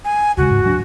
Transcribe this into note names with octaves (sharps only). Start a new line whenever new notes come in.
G#5
D#2 C#3 G#3 F#4
G#2
D1 F#3 D4